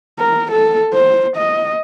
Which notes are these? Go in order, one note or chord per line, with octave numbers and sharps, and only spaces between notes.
A#4
A4
C5
D#5